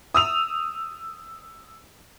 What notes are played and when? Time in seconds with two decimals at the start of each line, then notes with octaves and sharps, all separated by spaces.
0.14 D#6 E6 F7